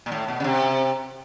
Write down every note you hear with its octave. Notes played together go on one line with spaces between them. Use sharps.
A#2
A2
B2
C#3
C3